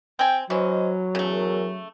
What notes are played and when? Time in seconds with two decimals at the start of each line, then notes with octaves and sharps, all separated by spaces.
0.19 C4 G5 G#5
0.50 E3 F#3 C#4 C5 D#5
1.15 E2 C#3 A3 G#4 A#4